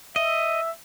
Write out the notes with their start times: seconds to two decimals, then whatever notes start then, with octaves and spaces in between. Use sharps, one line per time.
0.16 D#5 E5